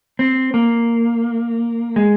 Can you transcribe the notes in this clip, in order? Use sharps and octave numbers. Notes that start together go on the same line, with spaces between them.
C4
A#3
G#3